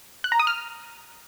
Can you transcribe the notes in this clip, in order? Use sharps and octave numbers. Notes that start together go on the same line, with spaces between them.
F#6
A#5
D#6
F6